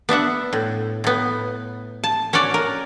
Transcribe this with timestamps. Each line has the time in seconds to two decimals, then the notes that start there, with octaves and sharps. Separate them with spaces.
0.09 B3 D4 E5 F#5
0.53 A2
1.04 A2 B3
2.04 A5
2.33 C#4 F#4 C#5 D5
2.54 A#4